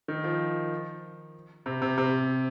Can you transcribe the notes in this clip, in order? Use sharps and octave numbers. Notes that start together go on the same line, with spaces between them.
D#3
F3
C3
C3
C3